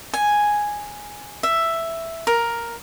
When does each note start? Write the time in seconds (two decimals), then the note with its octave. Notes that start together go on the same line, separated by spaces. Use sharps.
0.14 G#5
1.43 E5
2.27 A#4